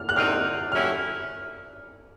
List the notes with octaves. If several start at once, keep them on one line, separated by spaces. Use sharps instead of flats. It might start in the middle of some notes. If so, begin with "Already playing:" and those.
Already playing: F6
F#6
C3 D#3 G#3 C4 D#4 F6
F#3 A3 C#4 E4 G4 F6